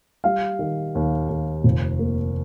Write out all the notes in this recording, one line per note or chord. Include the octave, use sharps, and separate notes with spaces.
G3 F5
D#3
D#2
D#2
F1
A#3